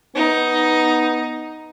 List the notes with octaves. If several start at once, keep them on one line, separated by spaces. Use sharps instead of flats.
B3 D#4